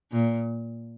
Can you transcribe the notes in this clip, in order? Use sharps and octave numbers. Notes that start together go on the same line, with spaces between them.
A#2